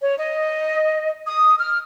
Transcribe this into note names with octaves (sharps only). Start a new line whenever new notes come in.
C#5
D#5
D#6
F6